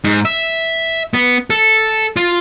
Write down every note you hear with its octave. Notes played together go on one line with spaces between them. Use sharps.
G#2
E5
B3
A4
F4